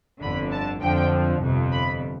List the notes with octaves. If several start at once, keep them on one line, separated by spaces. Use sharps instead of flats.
G1 F2 D3 B5
A5
F2 D3 F3 G5
G1 F2 C3
B5